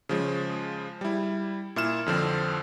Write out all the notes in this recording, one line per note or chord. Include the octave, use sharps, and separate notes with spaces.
C#3 F3 G#3
G3 E4
A#2 E4 F6 E7
F2 D3 F3 C4